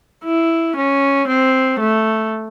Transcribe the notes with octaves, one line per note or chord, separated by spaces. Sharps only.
E4
C#4
C4
A3